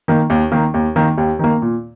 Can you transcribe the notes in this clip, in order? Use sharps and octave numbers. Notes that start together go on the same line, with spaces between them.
D#3 A#3
D#2
D#3 A#3
D#2
D#3 A#3
D#2
D#3 A#3
A#2